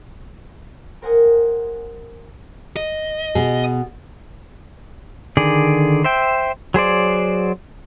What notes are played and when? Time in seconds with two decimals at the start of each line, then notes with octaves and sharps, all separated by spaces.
1.01 G4 A#4 C5 F#5 G#5 D#6
2.76 D#5
3.35 B2 G#4
5.37 D3 D#3 G#4 D5
6.04 C5 E5 G5
6.74 F#3 G#4 C5 D5